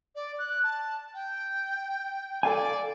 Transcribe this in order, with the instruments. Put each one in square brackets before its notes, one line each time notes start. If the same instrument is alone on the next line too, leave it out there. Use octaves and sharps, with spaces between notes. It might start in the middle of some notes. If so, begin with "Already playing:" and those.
[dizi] D5
F#6
A5
G5
[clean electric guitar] A4 F5 G#5 [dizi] D5